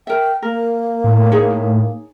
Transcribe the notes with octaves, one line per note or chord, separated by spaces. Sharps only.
A#4 E5 G5
A#3 A#4
A2
D#4 G#4 C#5